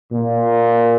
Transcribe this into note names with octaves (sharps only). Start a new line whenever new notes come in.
A#2